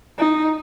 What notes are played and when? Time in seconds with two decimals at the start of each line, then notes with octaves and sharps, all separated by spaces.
0.18 D#4